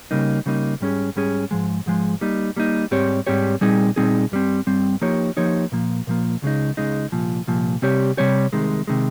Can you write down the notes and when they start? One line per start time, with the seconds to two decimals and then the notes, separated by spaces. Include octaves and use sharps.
0.11 C#3 G3 A#3 D#4
0.46 C#3 G3 A#3 D#4
0.81 G#2 G3 C#4 G#4
1.16 G#2 G3 C#4 G#4
1.51 G#2 F3 G#3
1.86 G#2 F3 G#3
2.21 G3 A#3 D#4
2.57 G3 A#3 D#4
2.91 G#2 G3 C4 G4 C#5
3.27 G#2 G3 C4 G4 C#5
3.61 A#2 G3 C4 D#4 G#4
3.96 A#2 G3 C4 D#4 G#4
4.32 G2 G3 C4
4.67 G2 G3 C4
5.02 F3 A#3 D#4 G4 C#5
5.37 F3 A#3 D#4 G4 C#5
5.72 A#2 F3 A#3
6.07 A#2 F3 A#3
6.42 C#2 C#3 G#3 D#4
6.77 C#2 C#3 G#3 D#4
7.12 C2 A#2 F3
7.47 C2 A#2 F3
7.82 C3 G3 C4 G4 C#5
8.17 C3 G3 C4 G4 C#5
8.53 C2 C3 D#3 G#3
8.87 C3 D#3 G#3